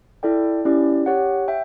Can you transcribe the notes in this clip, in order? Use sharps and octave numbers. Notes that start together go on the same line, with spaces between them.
E4 A4 D5 G5
C#4 E4 G4 D5
G4 C#5 F#5
E5 G5